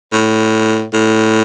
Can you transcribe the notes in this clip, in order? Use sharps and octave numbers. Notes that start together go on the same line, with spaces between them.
A2
A2